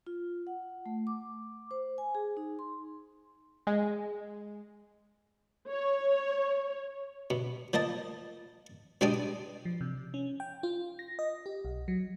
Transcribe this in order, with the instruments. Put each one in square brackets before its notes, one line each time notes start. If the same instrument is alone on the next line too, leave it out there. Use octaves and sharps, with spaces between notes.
[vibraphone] F4
F#5
A3
D6
C5
G#5
G#4
D#4
C6
[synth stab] G#3
[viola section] C#5
[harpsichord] B2
F3 A#3 D#5 A5
B2 G#3 D4 G4 D5 D#6
[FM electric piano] F3
C3
C#4
G5
F4
A#6
D#5
G4
B1
F#3